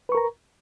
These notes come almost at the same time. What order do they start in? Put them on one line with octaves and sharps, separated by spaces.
B4 C#6 A#4 A#5